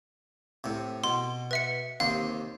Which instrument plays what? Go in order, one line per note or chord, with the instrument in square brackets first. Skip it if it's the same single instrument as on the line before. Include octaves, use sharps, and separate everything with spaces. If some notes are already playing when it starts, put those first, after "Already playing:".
[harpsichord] A2 C3
[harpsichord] B2 [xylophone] C6
[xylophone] B4 E5 C#7
[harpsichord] D#2 C3 C6 [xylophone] F5